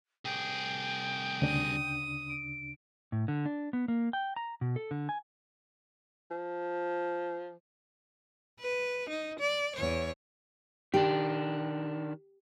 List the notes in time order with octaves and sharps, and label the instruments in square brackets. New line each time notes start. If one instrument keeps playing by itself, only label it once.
[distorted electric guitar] C2 G#4 [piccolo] G5
[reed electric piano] D2 C#3 D4 [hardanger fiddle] D#6
[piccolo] D7
[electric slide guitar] A2
D3
D4
B3
A#3
G5
A#5
B2
A4
D3
G#5
[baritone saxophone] F3
[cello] B4
D#4
D5
E2 C#5
[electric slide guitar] D#3 D4 [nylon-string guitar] G4